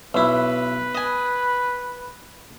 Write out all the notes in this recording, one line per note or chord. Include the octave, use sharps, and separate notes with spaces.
B1 E4 B4
D#5 G#5